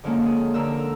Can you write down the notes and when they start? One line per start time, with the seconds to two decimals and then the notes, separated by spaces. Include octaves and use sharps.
0.04 D3 F3 G#3 A#3 C#4
0.25 G#4
0.54 D3 A#4 A#5 E6